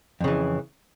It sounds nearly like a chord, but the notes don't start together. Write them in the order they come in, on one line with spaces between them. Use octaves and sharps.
F2 C#3 E3